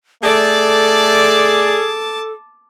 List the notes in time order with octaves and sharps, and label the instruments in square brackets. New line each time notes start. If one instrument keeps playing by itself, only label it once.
[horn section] A3 D5 [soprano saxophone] G#4 [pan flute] A4 [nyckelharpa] A5 D6